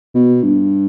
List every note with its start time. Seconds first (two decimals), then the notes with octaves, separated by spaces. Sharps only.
0.15 B2
0.43 G2